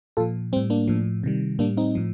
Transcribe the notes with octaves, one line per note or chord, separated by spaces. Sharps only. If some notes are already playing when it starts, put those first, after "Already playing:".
A#2 F3 F4 A4
A2 G3 C4
A#3 D4
A2 F3
C3 D#3 G3
A2 G3 A#3 D4
C4 D#4
A2 F3